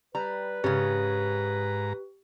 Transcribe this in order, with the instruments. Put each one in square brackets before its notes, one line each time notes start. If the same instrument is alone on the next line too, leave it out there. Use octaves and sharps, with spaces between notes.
[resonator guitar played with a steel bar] G3 A#5 [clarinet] B4
[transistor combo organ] G#2 A#5 [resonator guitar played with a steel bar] C#3 C#4 [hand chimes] G4